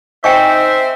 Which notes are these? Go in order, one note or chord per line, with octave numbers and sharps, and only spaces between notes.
C4 D#4 C5 E5 G5 G#5 C#6